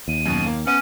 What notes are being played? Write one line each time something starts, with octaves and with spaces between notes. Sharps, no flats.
D#2 D#7
F#2 B2
A#3
B3 C#4 D#7